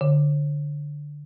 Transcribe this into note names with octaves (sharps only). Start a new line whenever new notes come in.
D3